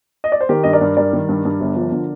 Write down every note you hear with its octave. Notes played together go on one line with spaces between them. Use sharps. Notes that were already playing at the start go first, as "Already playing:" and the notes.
D#5
D5
C5
D#3 G4 A#4
G2 D#5
A#4 D5
G2
G3 A#4 D5
D#3
G2
G2
G1
F3
D3